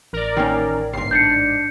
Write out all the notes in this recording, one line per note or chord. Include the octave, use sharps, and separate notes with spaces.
A1 A#4 D5
D#3 A#3 C#4
G1 C#2 G#2 C7
D4 G6 C7 C#7